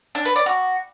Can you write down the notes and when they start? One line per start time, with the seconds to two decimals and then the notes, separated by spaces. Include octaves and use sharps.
0.15 D4
0.25 B4
0.36 D5
0.46 F#4